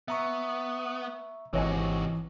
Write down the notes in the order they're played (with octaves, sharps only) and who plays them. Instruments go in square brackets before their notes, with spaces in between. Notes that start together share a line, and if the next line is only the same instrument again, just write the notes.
[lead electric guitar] B3 [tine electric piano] E5 A#5 C#6
[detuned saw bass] G#1 [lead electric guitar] C3 F#4 [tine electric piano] E3 [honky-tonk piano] C#5 D#5 G#5